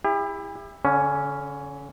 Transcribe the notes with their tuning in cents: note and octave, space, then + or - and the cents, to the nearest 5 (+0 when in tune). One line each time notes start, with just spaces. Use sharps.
E4 +0 G4 +45
D3 -35 C#4 +5